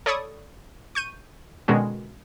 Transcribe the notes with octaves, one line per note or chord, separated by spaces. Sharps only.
A4 C#5 D5 B5 C#6 D#6
C#6 G6 D#7
B2 D3 D#3 G#3 C#4 F#4